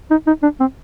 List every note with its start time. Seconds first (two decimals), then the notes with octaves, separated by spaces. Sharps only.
0.11 D#4
0.27 D#4
0.43 D4
0.60 C4